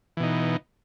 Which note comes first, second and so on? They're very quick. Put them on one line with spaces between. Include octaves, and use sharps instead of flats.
E3 B2 D#4